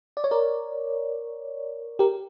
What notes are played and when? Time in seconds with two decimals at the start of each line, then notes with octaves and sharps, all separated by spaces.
0.17 D5
0.24 C#5
0.31 A#4 D5
1.99 G4 A#4